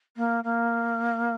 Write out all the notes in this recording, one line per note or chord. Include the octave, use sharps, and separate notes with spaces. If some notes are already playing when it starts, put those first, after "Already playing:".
A#3
A#3